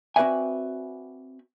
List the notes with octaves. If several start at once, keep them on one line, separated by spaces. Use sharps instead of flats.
C4 F#4 B4 D5 E5 G#5